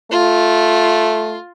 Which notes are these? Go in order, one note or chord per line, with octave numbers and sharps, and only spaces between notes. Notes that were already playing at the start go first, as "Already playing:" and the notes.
A3 F4